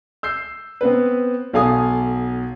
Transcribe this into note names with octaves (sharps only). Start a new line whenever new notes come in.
E6 G6 C7
B3 C4 B4
B1 A4 F5 G#5 D#6